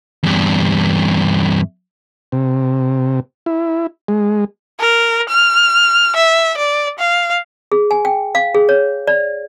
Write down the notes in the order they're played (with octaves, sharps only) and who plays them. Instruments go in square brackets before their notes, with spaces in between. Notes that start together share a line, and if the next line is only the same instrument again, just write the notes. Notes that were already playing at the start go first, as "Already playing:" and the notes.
[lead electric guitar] E2 G2
[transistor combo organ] C3
E4
G#3
[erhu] A#4
F6
E5
D5
F5
[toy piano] G#4
G#5
G5
F5
G#4
C#5
D5